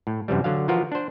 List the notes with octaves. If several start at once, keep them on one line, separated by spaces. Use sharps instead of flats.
A2
F#2 C3 E3 G3
D3 F#3 F5
E3 F3 F4 F#4 A#4
D4 C5